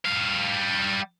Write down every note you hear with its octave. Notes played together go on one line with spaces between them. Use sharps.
G3 F5